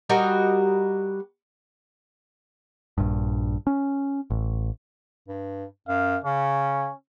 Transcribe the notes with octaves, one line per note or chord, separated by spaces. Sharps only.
G3 F#4 A#4 D#5
A#1 G2
C#4
A1
G2
F#2 F5
C#3 C#4